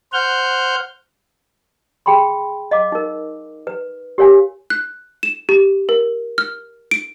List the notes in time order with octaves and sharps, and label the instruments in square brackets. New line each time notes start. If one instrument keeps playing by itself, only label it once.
[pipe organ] C5 F#5 F6 G6
[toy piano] G#4 G5 B5 C6
D#5 F5 D6
D#4 A#4
B4
G4 A#4 C#5 F5 G#5
[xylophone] F#6
E7
G4
A#4
F6
D7